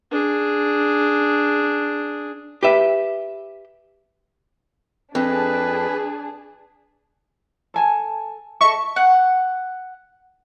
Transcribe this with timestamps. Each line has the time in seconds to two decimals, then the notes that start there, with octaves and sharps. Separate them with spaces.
0.11 D4 G#4
2.63 G4 B4 E5
5.15 F2 D4 G#4 B4
7.74 A4 G#5 A5
8.61 A4 D#5 E5 C#6
8.96 F#5